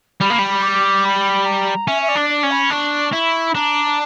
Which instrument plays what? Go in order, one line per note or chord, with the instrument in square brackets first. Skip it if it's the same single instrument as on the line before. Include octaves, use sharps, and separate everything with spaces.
[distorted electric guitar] G3 [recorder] B5
[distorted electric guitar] A#3
G3
[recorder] D6
B5
A#5
[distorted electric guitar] C#4 [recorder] E5
[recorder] E5
D5
[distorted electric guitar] D4
[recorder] D5
[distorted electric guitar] C#4
[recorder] B5
[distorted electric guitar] D4 [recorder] C#6
[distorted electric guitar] E4
[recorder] B5
[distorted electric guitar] D4 [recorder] A#5